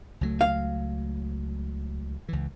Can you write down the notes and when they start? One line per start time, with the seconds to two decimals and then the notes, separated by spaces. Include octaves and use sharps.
0.21 C#2 F#3 A3
0.41 F5
2.29 C#2 E3